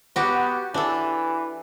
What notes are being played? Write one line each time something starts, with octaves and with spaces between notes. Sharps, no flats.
B3 F#4 G4
E3 D4 A4